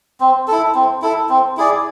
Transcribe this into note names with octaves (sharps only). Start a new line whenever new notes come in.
C4
E4 A4
C4
E4 A4
C4
E4 G#4 D5